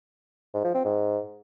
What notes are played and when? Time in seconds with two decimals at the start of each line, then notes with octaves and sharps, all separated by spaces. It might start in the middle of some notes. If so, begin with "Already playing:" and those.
0.54 G#2
0.64 F3
0.74 C4
0.85 G#2